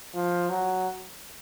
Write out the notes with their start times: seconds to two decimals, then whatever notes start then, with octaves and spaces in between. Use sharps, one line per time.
0.14 F3
0.50 F#3